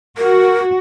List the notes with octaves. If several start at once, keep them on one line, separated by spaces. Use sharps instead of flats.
F#4 A#4